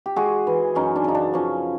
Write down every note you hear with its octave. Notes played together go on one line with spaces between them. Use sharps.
G4
G#3 F#4 G#4
E3
F#2 C#4 D#4
D4
C#3 D#4
D4
F3 C#4